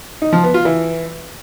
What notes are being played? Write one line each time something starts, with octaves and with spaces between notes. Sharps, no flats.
D#4
F3
B3
F4
E3